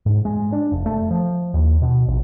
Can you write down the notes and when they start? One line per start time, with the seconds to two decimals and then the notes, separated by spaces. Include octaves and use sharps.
0.06 G#2
0.25 G#3
0.52 D4
0.72 F1
0.86 A3
1.11 F3
1.54 D#2
1.82 B2
2.08 A#1